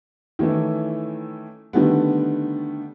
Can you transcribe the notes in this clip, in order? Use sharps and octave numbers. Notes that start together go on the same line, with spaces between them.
D#3 E3 A3 C#4 E4
D3 D#3 G3 A3 B3